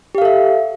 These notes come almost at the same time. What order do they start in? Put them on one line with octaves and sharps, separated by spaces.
G4 F5 A4 E5